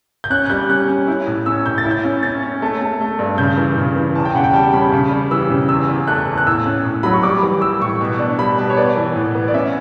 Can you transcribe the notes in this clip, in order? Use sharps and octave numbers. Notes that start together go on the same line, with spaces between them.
G6
C#4 F#6
F#6
G3 G6
C#4 F#6
C#4
E4
A2
C#4 E6
A2 G6
A6
E4
G6
C#4
C#4 A6
C#4
A3
A3
A3
G2
C#3 G6
E3
C#3
E3
E2 A5
G5
C#3 F#5
G5
G3 A5
C#4 B5
C#3
G3
E3 E6
C#3
E2 E6
E2
A3 F#6
E2
F#6
A2 E6
C#4
A2
F#3 B5
C#6
G3 D6
E3
G3 E6
A2 C#6
B2
D4
G3 B5
B2 A5
C#5
B3 D5
E3
A2
B3
D5
C#4 E5